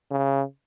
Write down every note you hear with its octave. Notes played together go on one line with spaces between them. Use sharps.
C#3